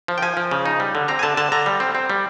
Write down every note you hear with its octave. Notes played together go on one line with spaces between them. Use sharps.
F3
G5
F3 G#5
F3
C#3
D#4
G3
D3
C4 A#5
G#5
D3 A5
D3 A5
D3 A#5
G3
C4
C4
G3